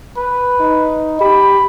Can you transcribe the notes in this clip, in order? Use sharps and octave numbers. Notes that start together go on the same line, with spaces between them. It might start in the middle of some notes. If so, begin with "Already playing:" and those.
B4
D#4
G4 B5